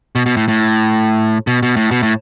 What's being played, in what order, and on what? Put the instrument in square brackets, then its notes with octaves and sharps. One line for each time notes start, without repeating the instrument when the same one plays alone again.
[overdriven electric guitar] B2
B2
A2
A2
B2
B2
A2
B2
A2